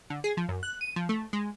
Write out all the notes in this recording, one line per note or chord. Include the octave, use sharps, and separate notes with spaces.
D3
G#4
F3
F#2
F#6
D#7
F3
A3
G#3